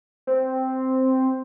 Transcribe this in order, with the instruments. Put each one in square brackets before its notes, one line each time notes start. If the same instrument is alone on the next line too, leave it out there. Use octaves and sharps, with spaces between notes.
[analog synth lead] C4